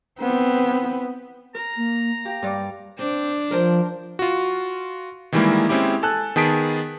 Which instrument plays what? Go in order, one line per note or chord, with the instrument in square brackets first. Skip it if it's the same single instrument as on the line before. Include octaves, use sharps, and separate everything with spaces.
[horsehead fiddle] B3 C4
[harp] A#4 [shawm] A#5
[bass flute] A#3
[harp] G4 [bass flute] F5
[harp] G2 D5 D6
[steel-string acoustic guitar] C4 [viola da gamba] D4
[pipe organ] F3 [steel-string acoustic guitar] A#4 C5 A5
[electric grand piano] F4 F#4
D#3 E3 G3 G#3 A#3 E4
G#3 C4 C#4 E4 G4
A4 G#5 A5 F#6
D#3 B3 G#4 A5 B6 D7